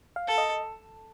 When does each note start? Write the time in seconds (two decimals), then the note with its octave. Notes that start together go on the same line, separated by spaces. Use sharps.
0.16 F5
0.27 A4
0.38 D#5